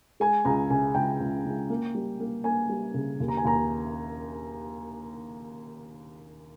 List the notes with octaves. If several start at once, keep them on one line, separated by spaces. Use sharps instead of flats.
G#3 G#5
C#2 A#5
C#3 G#5
C#2 G5
C#2
C#2
A#3
G3
A#3
A#3 G#5
G3
C#3
D#2
A#5
G#5
D#2 A#5